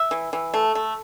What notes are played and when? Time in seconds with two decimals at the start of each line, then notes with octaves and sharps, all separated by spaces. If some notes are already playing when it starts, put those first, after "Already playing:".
Already playing: E5
0.11 E3
0.33 E3
0.54 A3
0.75 A3